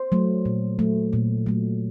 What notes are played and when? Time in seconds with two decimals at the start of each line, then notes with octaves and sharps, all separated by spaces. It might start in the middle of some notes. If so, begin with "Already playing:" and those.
Already playing: C5
0.12 F#3 A3
0.46 A#2
0.79 F#3 A3
1.13 A#2
1.46 F#3 A3